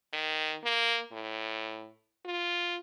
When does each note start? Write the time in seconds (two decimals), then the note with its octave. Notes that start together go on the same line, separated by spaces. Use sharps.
0.13 D#3
0.64 A#3
1.12 A2
2.25 F4